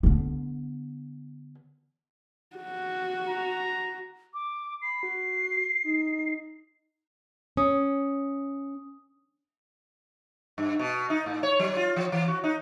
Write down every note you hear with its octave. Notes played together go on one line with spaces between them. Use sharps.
D3 B3
F#4
A#5
D6
B5 C7
F#4
D#4
C#4 D#6
G2
B2
D#4
A2
C#5
F#3
F4
F3
E3
F#4
D#4